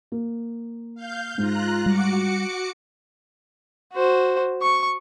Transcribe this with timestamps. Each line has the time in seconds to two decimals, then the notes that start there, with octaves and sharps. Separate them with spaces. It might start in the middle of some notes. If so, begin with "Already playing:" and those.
0.12 A#3
0.95 F5 G6
1.38 G#2 D#4 F4 A#5 F#6
1.86 G3 F#4 D6 C#7
3.94 F#4 C5
4.62 C#6